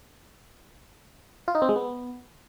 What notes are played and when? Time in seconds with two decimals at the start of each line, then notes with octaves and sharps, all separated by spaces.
1.48 F4
1.55 D#4
1.62 C4
1.69 G#3
1.76 B3